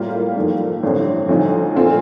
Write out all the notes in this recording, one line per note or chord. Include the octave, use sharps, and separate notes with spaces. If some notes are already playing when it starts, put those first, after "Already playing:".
Already playing: A2 G3 A#3 F4
F2 D#3 G3 A#3
A1 G2 D3 G3 C4
D2 D3 F3 C4 D#4
A#2 A3 C4 F4